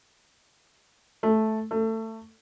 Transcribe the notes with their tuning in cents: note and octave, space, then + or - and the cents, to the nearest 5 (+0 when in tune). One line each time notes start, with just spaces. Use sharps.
A3 -10
A3 +20